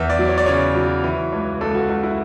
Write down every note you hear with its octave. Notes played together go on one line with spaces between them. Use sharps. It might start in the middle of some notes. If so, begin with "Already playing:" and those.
Already playing: E2 E3 E5
D5
F#3
C#5
D5
C#3 C#5
F#3
E3
C#2
C#2 A4
F#4
C#2 F#4
E4